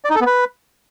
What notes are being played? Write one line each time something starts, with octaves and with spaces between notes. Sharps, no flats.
D5
D#4
A4
B3
B4